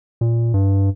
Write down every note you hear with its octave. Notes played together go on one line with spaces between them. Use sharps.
A#2
G2